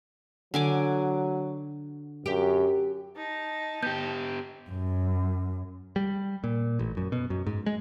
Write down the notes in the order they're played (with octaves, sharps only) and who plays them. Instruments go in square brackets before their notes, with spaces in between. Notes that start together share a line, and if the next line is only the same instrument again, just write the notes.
[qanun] D3 G#5 D6 [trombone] F#3
[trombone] F#2 [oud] G4
[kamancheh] D#4 A5
[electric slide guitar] B3 G4 [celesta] G6
[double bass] F#2
[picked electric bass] G3
A#2
A1
F#2
B2
F#2
G#2
G#3